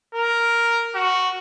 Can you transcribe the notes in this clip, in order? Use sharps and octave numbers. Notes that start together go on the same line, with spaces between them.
A#4
F#4